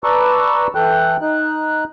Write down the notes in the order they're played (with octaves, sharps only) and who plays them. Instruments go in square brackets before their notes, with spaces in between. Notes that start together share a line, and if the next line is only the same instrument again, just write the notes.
[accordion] B4 D5 A5 A#5 C#6 E6
E3 A4 G5 F#6
D#4 F#6